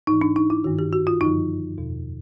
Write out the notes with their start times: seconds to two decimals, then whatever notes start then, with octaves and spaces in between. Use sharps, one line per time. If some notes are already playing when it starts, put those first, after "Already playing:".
0.07 G#2 E3 D#4
0.21 D4
0.36 D#4
0.50 E4
0.64 G2 D#3 F#4
0.79 G4
0.93 F#4
1.07 F4
1.21 F#2 D3 F3 D#4
1.78 E2 B2